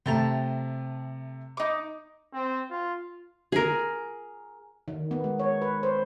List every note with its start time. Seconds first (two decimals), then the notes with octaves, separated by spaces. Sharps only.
0.06 C3 A3 G5 A5 A#5
1.57 D#4 D6
2.33 C4
2.70 F4
3.52 G#4 A#4
4.88 D#3
5.11 B3
5.24 G#3
5.39 C#5
5.62 B4
5.83 C5